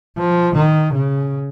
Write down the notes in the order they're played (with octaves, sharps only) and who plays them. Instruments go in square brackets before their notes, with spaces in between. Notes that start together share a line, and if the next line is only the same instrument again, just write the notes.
[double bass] F3
D#3
C#3